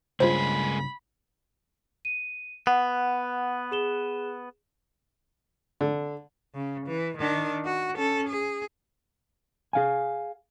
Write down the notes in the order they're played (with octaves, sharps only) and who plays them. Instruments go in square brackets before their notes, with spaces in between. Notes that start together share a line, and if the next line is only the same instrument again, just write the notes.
[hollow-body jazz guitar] C#2 G2 [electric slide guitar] G#3 A#3 G#4 [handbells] F4 C5 [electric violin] B5
[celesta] D#7
[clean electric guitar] B3 [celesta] F#5
[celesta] G#4 E7 G7
[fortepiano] D3
[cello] C#3
E3
D#3 D4
F#4
C#4 A4
G#4
[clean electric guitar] G#4 F5 G#5